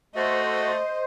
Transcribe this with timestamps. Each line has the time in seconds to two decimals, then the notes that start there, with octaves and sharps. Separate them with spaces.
0.16 A3 F#4 C5 D#5